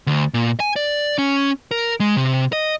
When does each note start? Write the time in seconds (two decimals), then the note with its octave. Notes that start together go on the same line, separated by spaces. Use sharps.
0.07 D2
0.34 A#2
0.60 G#5
0.76 D5
1.18 C#4
1.71 A#4
2.00 G#3
2.16 C3
2.53 D#5